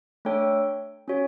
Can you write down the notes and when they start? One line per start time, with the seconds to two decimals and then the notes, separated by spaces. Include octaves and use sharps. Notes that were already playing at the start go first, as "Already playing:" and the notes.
0.25 A3 D4 A4 C#5 G5
1.08 C#4 F#4 C#5